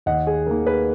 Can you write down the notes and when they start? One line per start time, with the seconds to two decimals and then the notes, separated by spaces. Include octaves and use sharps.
0.06 D#2 D#5 F#5
0.27 G#4
0.46 D#3 A#3 A#4
0.66 G#4 B4